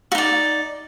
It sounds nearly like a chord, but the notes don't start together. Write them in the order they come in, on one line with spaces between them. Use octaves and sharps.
F#4 D#4 D5